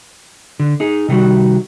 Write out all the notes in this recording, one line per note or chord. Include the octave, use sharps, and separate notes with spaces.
D3
D#4 G#4
C3 D#3 G3 F#4